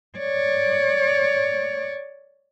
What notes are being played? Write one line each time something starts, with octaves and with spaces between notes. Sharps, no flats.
C#5 D5